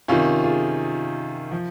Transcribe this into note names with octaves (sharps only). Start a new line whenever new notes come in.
C3 D#3 C#4 F4
F4 G#4
F3